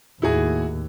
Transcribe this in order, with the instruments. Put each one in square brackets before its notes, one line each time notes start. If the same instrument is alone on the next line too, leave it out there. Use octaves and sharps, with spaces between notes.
[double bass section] D#2 A2 [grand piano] E4 F#4 G#4